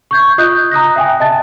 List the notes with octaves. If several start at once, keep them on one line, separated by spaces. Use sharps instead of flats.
C#6 G6 G#6
F4 D#5 D#6 F#6 G6
A#5 D#6 F#6 A#6
E5 G5 G#5
D#5 A5 A6